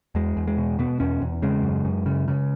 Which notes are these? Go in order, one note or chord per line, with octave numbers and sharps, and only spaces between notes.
E2 G#3
E2
G#3
B2
B2 B3
E2 C#4
E2
C#3 G#3
F#2
F#2
C#3
C#3